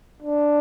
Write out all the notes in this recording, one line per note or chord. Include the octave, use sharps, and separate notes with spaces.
D4